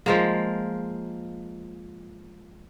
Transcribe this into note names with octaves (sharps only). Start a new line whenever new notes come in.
F3 G#3 A#3